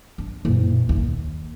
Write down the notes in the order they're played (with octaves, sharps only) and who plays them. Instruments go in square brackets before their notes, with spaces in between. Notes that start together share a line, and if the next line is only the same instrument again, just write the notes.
[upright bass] D4
F#1 A#2
D#2